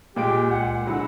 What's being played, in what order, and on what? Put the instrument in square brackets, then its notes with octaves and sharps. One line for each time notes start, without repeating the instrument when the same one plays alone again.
[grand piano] A#2 G#3 D7 [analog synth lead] A#3 [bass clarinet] G4
[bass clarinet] C#2 [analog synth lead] F#5
[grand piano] D3 F#3 G#3 [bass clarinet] E4